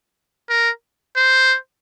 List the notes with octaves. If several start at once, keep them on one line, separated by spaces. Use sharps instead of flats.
A#4
C5